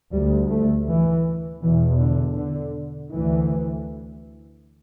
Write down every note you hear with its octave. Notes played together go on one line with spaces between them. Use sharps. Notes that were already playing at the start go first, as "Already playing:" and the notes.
D2 G3
A3
E3
E2 B2 E3
D3
D3
D2 E3